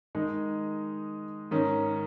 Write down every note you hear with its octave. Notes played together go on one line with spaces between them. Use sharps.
D#3 G#3 D#4
G#2 D#3 C#4